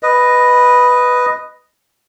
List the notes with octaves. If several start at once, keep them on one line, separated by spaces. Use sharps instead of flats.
B4 D#5